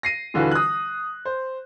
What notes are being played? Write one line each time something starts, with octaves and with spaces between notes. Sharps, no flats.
A#6 C7 D#7
D#1 D3 E3 F4 F#4 B4
D#6 F#6
C5